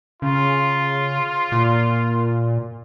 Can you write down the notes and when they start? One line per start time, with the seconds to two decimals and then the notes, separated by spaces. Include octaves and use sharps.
0.22 C#3 F4
1.52 A#2